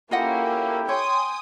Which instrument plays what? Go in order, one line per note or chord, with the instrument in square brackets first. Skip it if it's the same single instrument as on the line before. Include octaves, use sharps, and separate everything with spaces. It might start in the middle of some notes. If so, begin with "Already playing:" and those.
[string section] A#3 C#4 [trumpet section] E4 G4 A4 [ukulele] F4 D#5 F#5
[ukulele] C#5 [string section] G5 G#5 D#6 [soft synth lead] C6